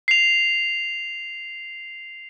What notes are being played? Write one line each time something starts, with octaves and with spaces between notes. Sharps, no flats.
C7 F7